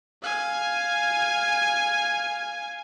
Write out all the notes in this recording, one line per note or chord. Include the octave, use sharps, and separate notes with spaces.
F5 G#5